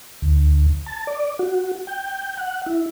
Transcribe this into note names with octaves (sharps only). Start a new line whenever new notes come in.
D2
A5
D5
F#4
G5
F#5
E4